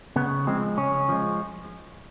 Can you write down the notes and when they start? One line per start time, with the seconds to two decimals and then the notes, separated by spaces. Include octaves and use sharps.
0.16 C#3 B3
0.47 F3 G#3 C4
0.77 C#3 C#4
1.09 F3 G#3